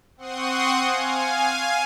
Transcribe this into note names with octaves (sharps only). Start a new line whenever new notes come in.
C4 F#5 C6 C#6 D#6
F5 G#5